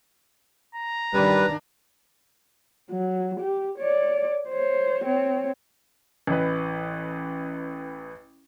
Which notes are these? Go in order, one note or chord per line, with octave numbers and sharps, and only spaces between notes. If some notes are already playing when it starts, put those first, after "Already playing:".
A#5
D#3 G3 D4 B4
F#3
G4
C#5 D5
C5 C#5
C4 C#5
A1 E3 B4